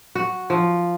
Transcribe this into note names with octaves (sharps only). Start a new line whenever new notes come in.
F#4
F3